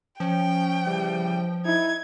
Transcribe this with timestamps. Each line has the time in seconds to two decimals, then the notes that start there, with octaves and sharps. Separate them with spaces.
0.20 F3 C#4 G5
0.86 C#3 E3 G3
1.66 D#4 E4 G#6